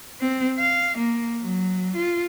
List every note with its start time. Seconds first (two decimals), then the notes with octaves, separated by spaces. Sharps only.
0.20 C4
0.59 F5
0.98 A#3
1.41 F#3
1.96 F4